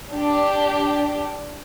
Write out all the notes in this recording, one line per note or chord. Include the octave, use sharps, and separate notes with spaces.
D4 G4